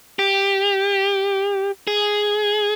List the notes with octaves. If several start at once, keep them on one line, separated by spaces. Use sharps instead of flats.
G4
G#4